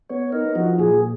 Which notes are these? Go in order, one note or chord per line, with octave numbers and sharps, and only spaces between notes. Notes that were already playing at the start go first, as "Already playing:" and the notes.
B3 C#5
D#4 A#4
F3 F#4
A#2 G#4